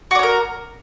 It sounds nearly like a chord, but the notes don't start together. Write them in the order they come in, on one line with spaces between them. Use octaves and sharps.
F#4 D5 C#5 A#4